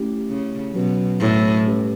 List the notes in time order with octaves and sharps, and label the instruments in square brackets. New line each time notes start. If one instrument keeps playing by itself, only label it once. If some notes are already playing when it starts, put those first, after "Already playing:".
Already playing: [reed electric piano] A3 C#4 E4 G4
[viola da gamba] C#3
[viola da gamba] B2 [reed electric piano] F#3 C#4 F#4 B4
[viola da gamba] A2
[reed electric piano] G3 C#4 G4 B4